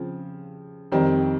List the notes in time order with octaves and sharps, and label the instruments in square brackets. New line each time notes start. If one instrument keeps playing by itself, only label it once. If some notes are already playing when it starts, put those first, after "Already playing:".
Already playing: [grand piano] C#3 F3 C4
F2 D#3 G3 C4